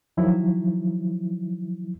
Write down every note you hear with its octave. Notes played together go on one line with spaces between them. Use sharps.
D#3 F3 F#3 E4